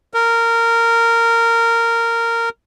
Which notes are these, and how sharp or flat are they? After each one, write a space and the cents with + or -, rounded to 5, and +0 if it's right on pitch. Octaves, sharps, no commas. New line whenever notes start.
A#4 -15